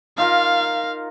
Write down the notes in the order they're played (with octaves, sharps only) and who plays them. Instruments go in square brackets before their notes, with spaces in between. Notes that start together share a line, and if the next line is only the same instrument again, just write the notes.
[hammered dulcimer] D#4 F4 A#4 [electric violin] F5